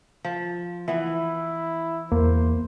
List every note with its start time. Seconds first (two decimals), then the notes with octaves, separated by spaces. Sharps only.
0.24 F3
0.88 E3 B3 E4
2.12 E2 A#3 C5